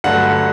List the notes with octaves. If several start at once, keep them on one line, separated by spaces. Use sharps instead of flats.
G2 D3 F#3 A3 F#5